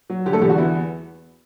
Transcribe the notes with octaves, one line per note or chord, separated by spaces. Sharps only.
F#3
D3 G3 G4
A3 A4
E2 G3 G4
F#4
B3 E4